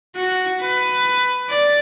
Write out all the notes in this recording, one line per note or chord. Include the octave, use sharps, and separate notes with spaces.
F#4
B4
D5